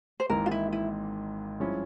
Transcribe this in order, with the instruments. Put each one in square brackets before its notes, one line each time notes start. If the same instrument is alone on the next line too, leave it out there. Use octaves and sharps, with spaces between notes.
[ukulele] C5
[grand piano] G#1 G#2 E3 A#3 [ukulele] A#4
[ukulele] F4
E4
E4
[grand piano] G2 F3 G#3 C#4 E4